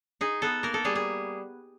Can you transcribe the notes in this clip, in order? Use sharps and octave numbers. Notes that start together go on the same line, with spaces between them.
D#4 G#4
B3 A4
A#3 A#4
A4
G3 G#4
G#4